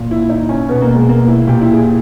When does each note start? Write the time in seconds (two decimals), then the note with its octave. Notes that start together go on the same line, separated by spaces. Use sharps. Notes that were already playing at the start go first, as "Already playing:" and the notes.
Already playing: A#2
0.11 E4
0.29 D#4
0.49 C#4
0.69 B2 B3
0.82 A#3
0.95 G#3
1.09 A#3
1.28 E4
1.47 A#2 G4
1.61 E4
1.73 G#4